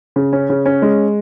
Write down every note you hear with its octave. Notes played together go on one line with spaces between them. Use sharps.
C#3
C#4
C#3
C#4
G#3